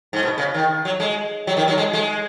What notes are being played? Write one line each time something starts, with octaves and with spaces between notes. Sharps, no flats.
G#2
B2
C#3
D#3
F#3
G#3
F#3
D#3
F#3
G#3
G#3